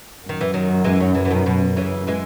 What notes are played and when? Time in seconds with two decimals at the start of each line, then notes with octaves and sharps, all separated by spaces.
0.23 F#2
0.29 D#3
0.41 E3
0.53 D#3 F#3
0.84 E3 G#3
1.00 D#3 F#3
1.15 C#3 E3
1.25 E3
1.31 B2 D#3
1.46 B2
1.76 C#3 E3
2.07 E3 G#3